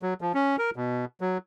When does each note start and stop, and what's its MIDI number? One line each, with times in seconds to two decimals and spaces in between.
0.02 0.14 54
0.21 0.32 53
0.34 0.56 61
0.58 0.70 70
0.76 1.05 47
1.21 1.38 54